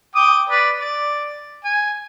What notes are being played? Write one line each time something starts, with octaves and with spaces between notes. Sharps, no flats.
G5 D6 D#6
B4 D5
D5
G#5